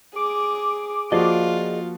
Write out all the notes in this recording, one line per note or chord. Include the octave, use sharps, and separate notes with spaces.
G#4 D6
F3 A#3 F4 F#4 G#4 D5 D#5